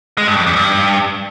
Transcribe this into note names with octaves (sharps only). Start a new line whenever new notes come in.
G#3
G2
F2
E2
G2